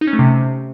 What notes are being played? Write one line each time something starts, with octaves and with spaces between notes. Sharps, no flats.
D#4
C#4
A3
C3